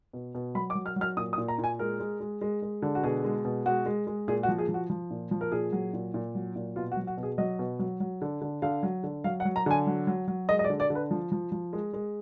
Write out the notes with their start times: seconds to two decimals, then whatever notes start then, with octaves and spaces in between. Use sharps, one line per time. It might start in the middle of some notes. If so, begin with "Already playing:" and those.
0.13 B2
0.35 B2
0.55 F#3 B5
0.70 D6
0.75 F#3
0.86 F6
0.96 F#3 F6
1.17 A#2 D#6
1.33 D#6
1.38 A#2
1.48 A#5
1.58 A#2
1.64 G#5
1.79 G#3 A#4
2.00 G#3
2.20 G#3
2.41 G#3
2.62 G#3
2.82 D3
2.95 F#4
3.03 B2 G#4
3.24 G#3
3.45 B2
3.66 G#3 F#4
3.86 G#3
4.07 G#3
4.28 A#2 G#4
4.43 F#4
4.49 F3
4.58 G#4
4.69 F3
4.74 F#4
4.90 F3
5.11 A#2
5.31 F3
5.41 A#4
5.52 A#2 G#4
5.72 F#3
5.93 A#2
6.14 A#2
6.35 F#3
6.56 A#2
6.76 B2 F4
6.92 F#4
6.97 F#3
7.07 F#4
7.17 B2
7.23 G#4
7.38 F#3 D#5
7.59 B2
7.79 F#3
8.00 F#3
8.22 D3
8.41 D3
8.62 D3 F5
8.83 F#3
9.03 D3
9.24 F#3 F5
9.40 F#5
9.45 F#3
9.56 A#5
9.66 D3 G#5
9.87 F#3
10.07 F#3
10.28 F#3
10.49 G#3 D#5
10.59 D#5
10.64 D5
10.70 D3
10.80 D5
10.90 D3
10.95 B4
11.11 F3
11.32 F3
11.52 F3
11.73 G#3
11.93 G#3